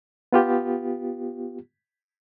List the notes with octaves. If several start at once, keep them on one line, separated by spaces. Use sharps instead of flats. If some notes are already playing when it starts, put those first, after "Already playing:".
B3 F4 G4